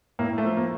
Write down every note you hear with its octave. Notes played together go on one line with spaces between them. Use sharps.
A2 A#3
A3
F3
A#3